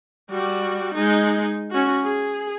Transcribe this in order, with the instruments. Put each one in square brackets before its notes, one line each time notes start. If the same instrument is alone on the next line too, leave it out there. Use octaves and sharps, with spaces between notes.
[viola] G3 F#4
G#3 D#4
C#4 F#4
G#4